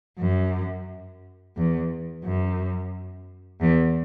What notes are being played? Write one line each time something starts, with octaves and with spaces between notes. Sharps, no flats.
F#2
E2
F#2
E2